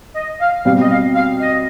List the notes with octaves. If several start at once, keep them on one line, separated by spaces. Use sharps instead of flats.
D#5
F5
B2 G3 C4 F5
D#5
F5
F5
D#5